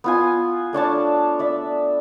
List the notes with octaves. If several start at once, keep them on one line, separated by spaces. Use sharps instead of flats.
B3 F4 G#5
A3 D4 C#5 A5
D5 E5